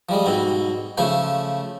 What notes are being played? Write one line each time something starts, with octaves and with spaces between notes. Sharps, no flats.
F3 G3 G#3
G#2 B2 C4
C#3 F3 A3 C5